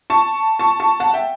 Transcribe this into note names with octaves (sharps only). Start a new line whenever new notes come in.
A5 C#6
A5 C#6
A5 C#6
F#5 A5
E5 G5